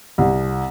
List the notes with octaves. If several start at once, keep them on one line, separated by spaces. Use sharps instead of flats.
C2